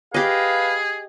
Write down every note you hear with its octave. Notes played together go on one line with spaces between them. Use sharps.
G4 G#4 B4 D#5 F5